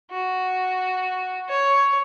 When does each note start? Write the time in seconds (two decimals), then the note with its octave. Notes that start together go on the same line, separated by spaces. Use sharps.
0.11 F#4
1.49 C#5